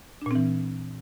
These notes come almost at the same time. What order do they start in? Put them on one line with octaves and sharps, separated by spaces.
D4 A#2 C4 E3